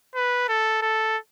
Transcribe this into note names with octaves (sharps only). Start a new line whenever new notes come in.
B4
A4
A4